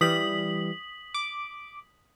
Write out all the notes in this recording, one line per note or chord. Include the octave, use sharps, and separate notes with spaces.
E3 G3 D#6 B6 F#7
D6